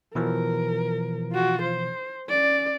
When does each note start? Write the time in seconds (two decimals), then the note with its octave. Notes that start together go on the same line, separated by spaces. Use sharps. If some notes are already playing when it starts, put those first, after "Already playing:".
0.15 B2 E3 F3 A#4
1.32 F4 F#4
1.62 C5
2.27 C#4 D5